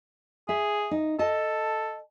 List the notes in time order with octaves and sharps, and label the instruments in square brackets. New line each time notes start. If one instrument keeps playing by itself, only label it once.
[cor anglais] G#4 [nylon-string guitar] E5
[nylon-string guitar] D#4
[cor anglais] A4 [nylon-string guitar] D#5 A5